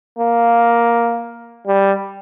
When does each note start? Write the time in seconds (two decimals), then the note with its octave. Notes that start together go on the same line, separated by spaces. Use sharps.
0.19 A#3
1.67 G3